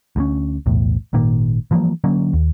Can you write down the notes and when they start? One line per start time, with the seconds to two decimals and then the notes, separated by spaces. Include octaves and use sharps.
0.16 D2 G3 C#4
0.66 B1 E2 A2
1.13 G#1 A#2 D#3 A#3
1.71 E3 F3 G3 A#3
2.04 D3 F#3 A#3 C#4
2.33 D#2